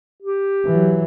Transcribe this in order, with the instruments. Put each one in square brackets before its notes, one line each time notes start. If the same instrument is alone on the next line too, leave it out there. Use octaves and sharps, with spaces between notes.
[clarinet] G4
[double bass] E3 F#3